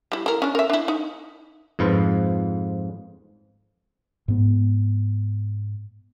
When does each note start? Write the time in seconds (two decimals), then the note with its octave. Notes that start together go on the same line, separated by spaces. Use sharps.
0.12 G3 E4
0.26 E4 A#4
0.42 C#4 D4
0.55 A#4 E5
0.70 D4 E4
0.88 D#4
1.79 F2 G#2 F3 F4 B4
4.28 G#2 B3